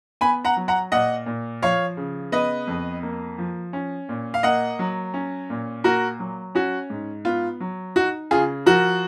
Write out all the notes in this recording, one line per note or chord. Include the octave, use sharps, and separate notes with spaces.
B3 G#5 B5
F#5 A#5
F#3
F#5 A#5
A#2 D#5 F#5
A#2
F3 C#5 F5
C#3
B3 B4 D#5
F2
A#3
F3
C#4
A#2
F5
A#3 D#5 F#5
F#3
C#4
A#2
A#3 F#4 A#4
F#3
C#4 F#4
G#2
B3 F4
F#3
D#4 F#4
C#3 F4 G#4
F3 F#4 A#4